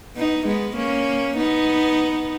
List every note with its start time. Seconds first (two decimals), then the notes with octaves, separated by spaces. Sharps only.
0.16 B3 D#4
0.46 G#3 B3
0.76 A#3 C#4
1.37 B3 D#4